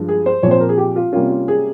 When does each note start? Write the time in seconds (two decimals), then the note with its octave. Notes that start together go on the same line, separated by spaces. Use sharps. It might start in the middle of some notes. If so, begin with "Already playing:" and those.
Already playing: G2 F3 G#3
0.08 G#4
0.26 C5
0.43 A#2 F3 C4 C#5
0.51 C5
0.60 A#4
0.69 G#4
0.77 G4
0.96 F4
1.12 C3 G3 A#3 C#4 F4
1.30 F4
1.48 G#4